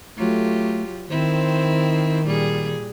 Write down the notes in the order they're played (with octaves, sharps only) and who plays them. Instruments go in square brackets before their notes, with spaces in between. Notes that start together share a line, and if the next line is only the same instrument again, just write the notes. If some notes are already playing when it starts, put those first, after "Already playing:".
[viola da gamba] F#3 F4 G4 [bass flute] A3
[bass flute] D#3 [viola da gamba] C4 E4 C5
[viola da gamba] A#2 G3 G#4